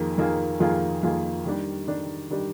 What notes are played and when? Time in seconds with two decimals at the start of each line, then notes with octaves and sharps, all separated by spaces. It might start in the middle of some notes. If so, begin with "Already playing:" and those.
Already playing: F2 D#3 A#3 F4 G#4
0.18 F2 D#3 A#3 F4 G#4
0.60 F2 D#3 A#3 F4 G#4
1.03 F2 D#3 A#3 F4 G#4
1.45 D#3 G3 D4 G4
1.87 D#3 G3 D4 G4
2.30 D#3 G3 D4 G4